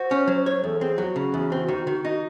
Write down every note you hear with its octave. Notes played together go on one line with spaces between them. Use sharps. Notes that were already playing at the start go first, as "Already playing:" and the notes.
Already playing: F#4 C5
C#4
F#3
C#5
E2 A4
C4 G#4
F#3 G#4
F#4
C#3
E2
C4
D#3
D#3
D#4